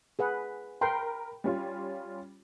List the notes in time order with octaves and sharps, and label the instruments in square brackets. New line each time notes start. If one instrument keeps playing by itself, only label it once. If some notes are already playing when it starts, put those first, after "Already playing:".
[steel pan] G#4 B4 F#5
[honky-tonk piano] A#4 B5 [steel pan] G5 C6
[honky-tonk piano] G3 C#4 F4